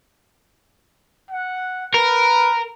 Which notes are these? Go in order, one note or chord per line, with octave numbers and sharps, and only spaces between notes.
F#5
A#4 B4